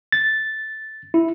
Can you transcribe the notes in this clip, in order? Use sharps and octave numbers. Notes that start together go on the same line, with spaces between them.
A6
E4